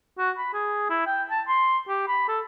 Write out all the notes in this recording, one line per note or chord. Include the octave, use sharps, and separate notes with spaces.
F#4
B5
G#4
E4
G5
A5
C6
G4
B5
A4